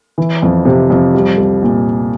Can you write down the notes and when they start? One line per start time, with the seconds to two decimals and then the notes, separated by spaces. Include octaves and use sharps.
0.18 E3
0.42 F2
0.65 C3
0.90 F2
1.15 G3
1.37 C2
1.63 A#2